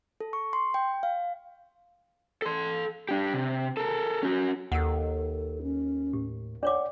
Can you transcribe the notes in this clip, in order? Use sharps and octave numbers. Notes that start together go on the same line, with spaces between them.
A4
C#6
C6
G5
F5
A4 C6
D4 G4
C3
A4 A#4
C#4 F#4
D#2 A4 F#5 E6
C#4
A2 G4
D4 C#5 D5 F#5 D6